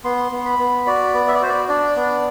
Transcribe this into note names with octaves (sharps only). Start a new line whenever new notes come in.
B3 C6
B3
B5
B3
F#4 D5
B3
E5
D5
F#4 C5
D5
D4 D5
B3